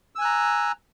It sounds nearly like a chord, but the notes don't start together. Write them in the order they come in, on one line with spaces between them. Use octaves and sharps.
E6 G#5 F#6 A#5